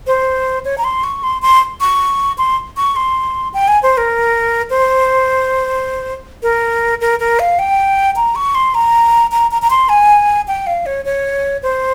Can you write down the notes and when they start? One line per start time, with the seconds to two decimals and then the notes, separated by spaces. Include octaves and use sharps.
0.07 C5
0.65 C#5
0.78 A#5
0.84 C6
1.04 C#6
1.23 C6
1.42 C6
1.81 C#6
2.38 C6
2.77 C#6
2.96 C6
3.54 G5
3.68 G#5
3.83 C5
3.97 A#4
4.70 C5
6.43 A#4
7.01 A#4
7.20 A#4
7.39 F5
7.59 G5
8.16 A#5
8.36 C#6
8.55 C6
8.74 A#5
9.32 A#5
9.51 A#5
9.62 A#5
9.70 C6
9.89 G#5
10.48 G5
10.67 F5
10.86 C#5
11.05 C#5
11.63 C5